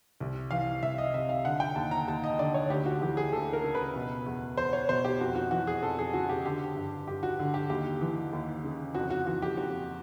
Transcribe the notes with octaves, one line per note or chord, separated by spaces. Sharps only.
C2
E3 F5
C2 E5
D#5
C3 E5
F5
D3 F#5
G5
D#2 A5
A#5
D#2 A5
D#5
D3 D5
C#5
D2 G4
F#4
E3 G4
G#4
D2 A4
A#4
C#3
B4
B2
E2
E2 C5
C#5
B2 C5
G4
F2 F#4
F#4
E3 F#4
G#4
F2 A4
G#4
C#3 F#4
G4
D3 G4
G2
G2 G4
F#4
D3
G4
D#2 G4
E3
D#2
C#3
F2 F#4
F#4
E3 F#4
G4
F2 F#4